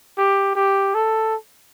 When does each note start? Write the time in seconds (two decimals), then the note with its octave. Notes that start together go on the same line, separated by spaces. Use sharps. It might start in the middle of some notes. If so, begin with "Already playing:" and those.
0.18 G4
0.55 G4
0.95 A4